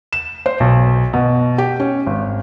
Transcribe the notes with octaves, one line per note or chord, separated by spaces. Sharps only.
E7
C5
B1
B2
G4
C#4
G#1